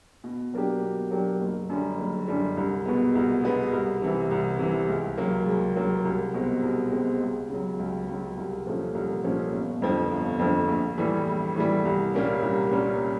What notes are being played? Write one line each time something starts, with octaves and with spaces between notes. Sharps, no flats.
B2
F#3 A#3 D4 G4
B2
F#3 A#3 D4 G4
F#1
F#2 D3 G3
F#1
F#2 D3 G3
C2
B2 G#3 B3
C2
B2 G#3 B3
C2
C3 E3
C2
C3 E3
C#2
C#3 F#3 A#3
C#2
C#3 F#3 A#3
C2
B2 G#3 C4
C2
B2 G#3 C4
C#2
C#3 F#3
C#2
C#3 F#3
C2
A#2 F3 A3 C#4
C2
A#2 F3 A3 C#4
G1
F2 D3 F3 A3
G1
F2 D3 F3 A3
A#1
A2 E3 G3
A#1
A2 E3 G3
C2
A#2 G3 A#3 C#4
C2
A#2 G3 A#3 C#4